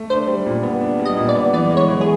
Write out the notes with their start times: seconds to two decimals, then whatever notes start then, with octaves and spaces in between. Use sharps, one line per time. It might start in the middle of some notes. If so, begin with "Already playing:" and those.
Already playing: A3
0.10 D4 C5
0.27 G3
0.46 A#2
0.63 B3
0.81 D4
0.99 G3
1.05 D#5
1.17 A#2
1.29 D5
1.35 B3
1.53 E3 D5
1.71 G#3
1.77 C#5
1.89 E3
2.01 G#4